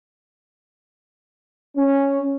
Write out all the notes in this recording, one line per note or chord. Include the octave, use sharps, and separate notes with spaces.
C#4